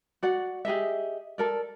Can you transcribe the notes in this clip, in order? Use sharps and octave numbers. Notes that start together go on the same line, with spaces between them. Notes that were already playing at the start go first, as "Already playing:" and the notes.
F#4 D5 F#5
G4 G#4 D#5 E5
A4 A#4 D5